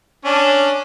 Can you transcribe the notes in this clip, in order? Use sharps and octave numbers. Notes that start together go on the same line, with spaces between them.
C#4 D4